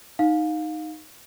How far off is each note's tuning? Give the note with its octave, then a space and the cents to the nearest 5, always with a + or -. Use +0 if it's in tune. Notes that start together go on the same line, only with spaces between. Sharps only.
D#4 +0 F5 +25